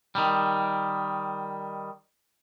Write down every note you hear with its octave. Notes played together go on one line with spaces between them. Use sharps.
D#3 G3